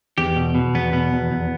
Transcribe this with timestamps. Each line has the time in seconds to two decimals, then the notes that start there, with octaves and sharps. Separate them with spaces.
0.18 E2 G4
0.36 B2
0.55 B2
0.75 E2 B3
0.92 B2 B3
1.13 E2
1.31 E2